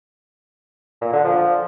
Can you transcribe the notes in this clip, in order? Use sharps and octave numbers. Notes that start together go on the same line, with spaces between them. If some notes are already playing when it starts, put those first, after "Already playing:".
A#2
D3
F3